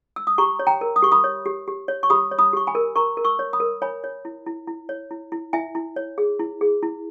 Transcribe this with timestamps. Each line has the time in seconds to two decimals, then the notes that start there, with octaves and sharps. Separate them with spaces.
0.16 E6
0.27 D#6
0.38 G4 A#5 C#6
0.59 C#5
0.67 G5 A#5
0.81 A#4
0.96 D#6
1.02 G4 C#6
1.12 B5 D#6
1.24 C#5
1.46 G4
1.68 G4
1.88 C#5
2.03 C#6
2.10 G4 B5 D#6
2.31 C#5
2.39 B5 D#6
2.53 G4 C#6
2.67 G#5 B5
2.75 A#4
2.96 A#4 A#5 C#6
3.17 A#4
3.24 C#6 E6
3.39 C#5
3.53 B5 D#6
3.60 A#4
3.82 C#5 G#5 B5
4.04 C#5
4.25 E4
4.46 E4
4.67 E4
4.89 C#5
5.11 E4
5.32 E4
5.53 E4 E5 G#5
5.75 E4
5.96 C#5
6.18 G#4
6.40 E4
6.61 G#4
6.83 E4